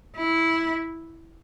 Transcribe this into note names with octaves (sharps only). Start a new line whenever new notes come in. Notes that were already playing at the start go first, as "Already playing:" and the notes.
E4